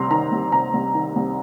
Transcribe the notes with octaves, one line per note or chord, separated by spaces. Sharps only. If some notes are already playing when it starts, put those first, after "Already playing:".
Already playing: C2 C3 A#5 C6
D#3 A#5
C2
C3 A#5
C2
D#3
C2